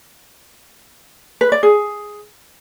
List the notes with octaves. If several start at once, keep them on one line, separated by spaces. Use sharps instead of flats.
B4
D5
G#4